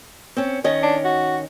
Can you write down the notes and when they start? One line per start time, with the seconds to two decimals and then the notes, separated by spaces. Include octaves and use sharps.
0.37 C4 C#4
0.64 D#3 C#4 D#5
0.83 D4
1.04 F#4